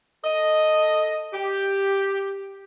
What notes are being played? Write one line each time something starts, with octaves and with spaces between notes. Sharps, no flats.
A4 D#5
G4